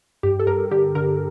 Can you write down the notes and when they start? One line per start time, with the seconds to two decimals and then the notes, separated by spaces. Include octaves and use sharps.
0.23 G2 G4
0.40 A4
0.47 G2 A#4
0.71 D3 G4
0.95 D3 A#4